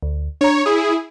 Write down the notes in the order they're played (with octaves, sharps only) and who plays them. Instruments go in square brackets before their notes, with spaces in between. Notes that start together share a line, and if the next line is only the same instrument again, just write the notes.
[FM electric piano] D2
[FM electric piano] D4 A#5 [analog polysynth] C#5
[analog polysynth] E4 G#4 [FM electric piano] D#6